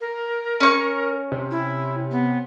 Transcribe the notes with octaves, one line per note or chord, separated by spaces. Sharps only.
A#4
C#4 C#6
C3
E4
B3